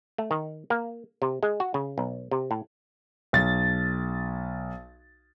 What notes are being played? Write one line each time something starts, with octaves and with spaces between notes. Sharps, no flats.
A3
D#3
A#3
C3
G#3
F#4
C#3
B1
C3
A2
B1 A6